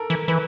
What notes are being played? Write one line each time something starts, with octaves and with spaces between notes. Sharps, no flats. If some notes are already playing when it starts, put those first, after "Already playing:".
Already playing: A4 A#4
E3
E3 B4